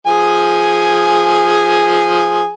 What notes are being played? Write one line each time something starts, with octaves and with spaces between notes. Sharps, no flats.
F3 G#4 G#5